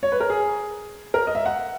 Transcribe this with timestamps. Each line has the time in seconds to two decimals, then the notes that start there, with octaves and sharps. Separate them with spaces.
0.03 C#5
0.12 B4
0.20 A#4
0.30 G#4
1.14 A#4
1.27 D#5
1.35 E5
1.46 F#5